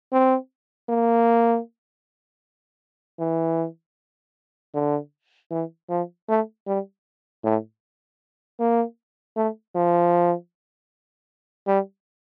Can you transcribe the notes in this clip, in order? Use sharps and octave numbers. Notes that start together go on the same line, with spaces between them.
C4
A#3
E3
D3
E3
F3
A3
G3
A2
A#3
A3
F3
G3